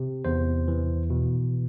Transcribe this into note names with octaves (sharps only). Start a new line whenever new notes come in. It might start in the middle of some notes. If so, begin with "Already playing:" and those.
Already playing: C3
E2 C5
E3
B2